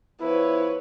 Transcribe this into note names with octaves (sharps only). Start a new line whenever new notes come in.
F3 B3 E4 B4 C#5